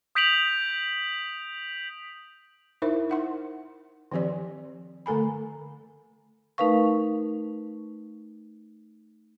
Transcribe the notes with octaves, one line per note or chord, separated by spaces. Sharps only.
D#6 G6 B6 D7 F7 F#7
D#4 E4 A#4 C5 E5
D#4 F#5 C6
D#3 F3 C4 G4 D5
D3 A3 A4 G#5 B5
A3 D#4 A#4 B4 F5 C#6